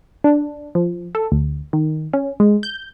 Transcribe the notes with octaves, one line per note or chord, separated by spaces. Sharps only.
D4
F3
A4
D2
D#3
C#4
G#3
G6